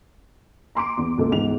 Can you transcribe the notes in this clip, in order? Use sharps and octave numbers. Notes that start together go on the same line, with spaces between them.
A#5 C6 D6 D7
E2
C#2 A#3 A4
E2 G#2 F7